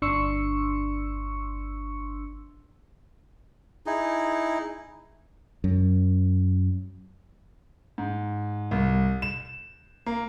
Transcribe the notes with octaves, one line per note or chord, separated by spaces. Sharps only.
G1 D4 C6 C#6 E6 C#7
D#4 E4 G#4
F#2
G#2
C2
E7
A#3